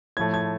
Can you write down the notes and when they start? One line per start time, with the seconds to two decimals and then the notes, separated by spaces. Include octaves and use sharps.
0.17 A2 F3 A3 G#6
0.34 G#6